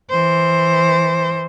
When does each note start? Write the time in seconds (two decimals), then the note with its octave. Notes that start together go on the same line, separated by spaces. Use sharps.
0.10 E3 C5